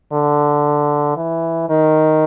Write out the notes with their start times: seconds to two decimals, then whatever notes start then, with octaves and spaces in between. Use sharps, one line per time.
0.13 D3
1.17 E3
1.70 D#3